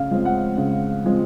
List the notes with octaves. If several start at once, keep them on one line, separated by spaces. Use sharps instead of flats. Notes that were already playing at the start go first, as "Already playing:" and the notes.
Already playing: C#3 F5
F3 G#3 C4
F#5
C#3
F3 G#3 C4